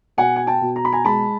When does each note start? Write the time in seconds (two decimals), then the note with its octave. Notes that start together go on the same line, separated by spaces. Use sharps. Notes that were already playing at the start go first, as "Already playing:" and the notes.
0.17 B2 F#5 G#5
0.36 G#5
0.47 G5 A5
0.61 B2
0.76 A#5
0.85 B5
0.92 G#5 A#5
1.05 G#3 A5 B5